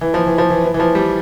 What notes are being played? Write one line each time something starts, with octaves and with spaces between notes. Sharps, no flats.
E3
F3
E3
F3
E3
E3
E3
F3
G3